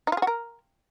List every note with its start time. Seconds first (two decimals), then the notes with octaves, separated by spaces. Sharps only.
0.07 D#4
0.12 F4
0.17 G#4
0.22 F#4
0.27 A#4